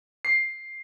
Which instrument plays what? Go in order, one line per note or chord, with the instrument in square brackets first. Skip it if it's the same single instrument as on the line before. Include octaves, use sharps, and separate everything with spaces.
[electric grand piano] C7